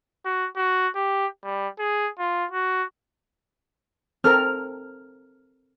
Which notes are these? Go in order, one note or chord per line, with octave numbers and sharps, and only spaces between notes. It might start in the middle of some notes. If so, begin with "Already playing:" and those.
F#4
F#4
G4
G3
G#4
F4
F#4
C4 A4 A#4 F6